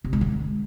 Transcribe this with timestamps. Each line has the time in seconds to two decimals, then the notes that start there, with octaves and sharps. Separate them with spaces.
0.04 C3
0.13 G#3
0.21 D3